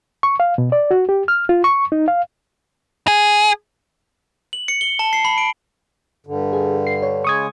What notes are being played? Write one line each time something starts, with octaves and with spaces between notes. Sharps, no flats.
C#6
F5
B2
D5
F#4
G4
F6
F4
C#6
D#4
F5
G#4
F#7
C#7
G7
A5
C7
B5
D7
G2 D3
G#4
C7
C#5
C#3 G#3 C#6 D#6 G#6